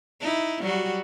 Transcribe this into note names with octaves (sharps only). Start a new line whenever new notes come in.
D#4 E4
F#3 G3 F#4